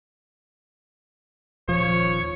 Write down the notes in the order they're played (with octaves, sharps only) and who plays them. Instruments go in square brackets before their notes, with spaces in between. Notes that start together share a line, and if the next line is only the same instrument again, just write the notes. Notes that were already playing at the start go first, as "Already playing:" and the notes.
[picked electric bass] D#1 F3 [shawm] C#5